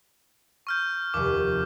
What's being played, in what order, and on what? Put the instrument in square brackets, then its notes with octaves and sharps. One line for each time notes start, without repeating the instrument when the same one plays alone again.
[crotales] C#6 F6 G6
[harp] F1 D#2 [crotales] D6